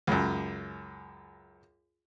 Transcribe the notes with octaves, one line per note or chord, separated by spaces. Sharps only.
C#2 F#2